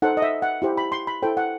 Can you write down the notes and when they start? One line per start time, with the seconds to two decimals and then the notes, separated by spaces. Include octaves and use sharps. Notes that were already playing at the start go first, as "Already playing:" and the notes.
0.02 D#4 A4 C5 F#5
0.17 D#5
0.22 E5
0.42 F#5
0.62 E4 G4 C5
0.77 B5
0.92 C6
1.07 B5
1.22 E4 A4 C5 G5
1.37 F#5